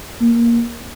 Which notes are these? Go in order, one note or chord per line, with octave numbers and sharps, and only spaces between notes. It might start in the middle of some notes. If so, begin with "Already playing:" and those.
A#3